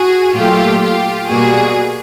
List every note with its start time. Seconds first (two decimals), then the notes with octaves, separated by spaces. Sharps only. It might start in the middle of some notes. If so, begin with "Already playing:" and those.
Already playing: F#4 G#4
0.36 A#2 F#3 A3 F4 G4
0.82 F4 G4
1.28 B2 G3 A#3 F#4 G#4